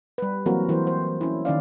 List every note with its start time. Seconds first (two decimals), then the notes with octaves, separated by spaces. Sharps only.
0.18 G3 B4
0.46 E3 F#3 A#3 C4 F#4 A#4
0.69 E3 A#4 C5
0.87 C5
1.21 C#4 E4
1.45 D#3 C#4 D5 F5